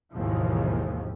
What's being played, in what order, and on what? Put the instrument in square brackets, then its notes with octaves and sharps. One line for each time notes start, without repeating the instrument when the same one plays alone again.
[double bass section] G#1 D#2 G#2 B2 E3 F3